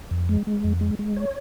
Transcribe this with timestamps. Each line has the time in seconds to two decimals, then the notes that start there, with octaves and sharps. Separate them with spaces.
0.11 F2
0.29 G#3
0.47 G#3
0.64 F2
0.81 G#3
0.99 G#3
1.17 C#5